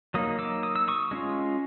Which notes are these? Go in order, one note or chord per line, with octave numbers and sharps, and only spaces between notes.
F#3 A#3 D#4 D#6
D6 E6
D#6
E6
C#6 D#6
G#3 C#4 F4